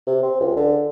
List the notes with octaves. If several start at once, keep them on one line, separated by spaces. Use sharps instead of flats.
C3
C4
C#2
D3